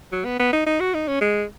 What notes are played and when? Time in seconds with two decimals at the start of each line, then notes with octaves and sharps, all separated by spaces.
0.12 F#3
0.25 B3
0.40 B3
0.53 D#4
0.66 D#4
0.80 F#4
0.94 D#4
1.08 C#4
1.21 G#3